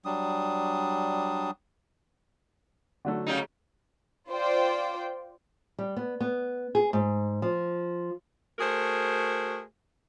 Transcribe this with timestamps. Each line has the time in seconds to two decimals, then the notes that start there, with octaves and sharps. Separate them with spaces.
0.05 F#3 G3 D4 D#6
3.05 D3 F#3 A3
3.27 C#3 G3 D#4
4.30 F4 C5 D5 G5
5.79 G3
5.97 B3
6.21 B3
6.75 G#4
6.93 G#2
7.42 F3
8.59 A3 F#4 G#4 A#4 C5